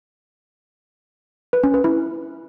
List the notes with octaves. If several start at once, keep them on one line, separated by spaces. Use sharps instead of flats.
B4
C#4
B4
E4